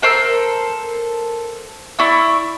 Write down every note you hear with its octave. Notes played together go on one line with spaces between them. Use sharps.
A4 A#4 C5 E6
E4 D5 C#6 E6